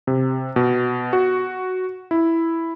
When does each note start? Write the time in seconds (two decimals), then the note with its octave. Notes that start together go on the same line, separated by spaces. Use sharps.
0.07 C3
0.56 B2
1.13 F#4
2.11 E4